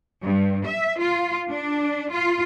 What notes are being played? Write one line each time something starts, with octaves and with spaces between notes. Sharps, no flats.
G2
E5
F4
D4
F4